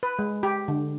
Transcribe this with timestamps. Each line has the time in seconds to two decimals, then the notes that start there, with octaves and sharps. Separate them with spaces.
0.03 B4
0.19 G#3
0.43 G4
0.68 D3